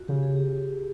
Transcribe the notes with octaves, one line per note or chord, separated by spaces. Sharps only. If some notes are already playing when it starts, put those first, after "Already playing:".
Already playing: F4 F#4
C#3 G4
G#4
G4